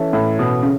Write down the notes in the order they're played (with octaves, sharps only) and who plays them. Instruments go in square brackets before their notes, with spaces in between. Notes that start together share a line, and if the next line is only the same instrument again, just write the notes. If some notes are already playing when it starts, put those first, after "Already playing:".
Already playing: [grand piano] E3 C#4 A4 E5
[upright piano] A2
B2
C#3